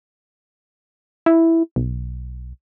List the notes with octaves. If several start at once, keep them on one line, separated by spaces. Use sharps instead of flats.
E4
B1